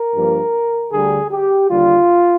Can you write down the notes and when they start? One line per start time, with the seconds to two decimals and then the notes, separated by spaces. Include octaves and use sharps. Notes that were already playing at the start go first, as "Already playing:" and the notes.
Already playing: A#4
0.14 G2 F3 A#3
0.91 D2 D3 G3 G#4
1.30 G4
1.69 D#2 D3 G3 F4